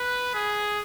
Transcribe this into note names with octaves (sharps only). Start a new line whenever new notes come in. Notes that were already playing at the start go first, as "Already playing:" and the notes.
Already playing: B4
G#4